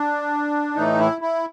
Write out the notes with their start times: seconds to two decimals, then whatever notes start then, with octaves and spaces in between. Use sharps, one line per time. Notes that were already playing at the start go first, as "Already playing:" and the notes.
Already playing: D4
0.75 A2 E3 A3 D#4
0.99 E4
1.21 E4